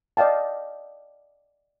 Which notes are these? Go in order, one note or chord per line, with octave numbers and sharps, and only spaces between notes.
D5 D#5 F5 G5 A5